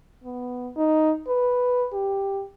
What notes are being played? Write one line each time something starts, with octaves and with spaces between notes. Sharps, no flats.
B3
D#4
B4
G4